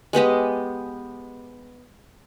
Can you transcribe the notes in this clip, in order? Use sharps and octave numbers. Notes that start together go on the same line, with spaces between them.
G#3 B3 G4 D#5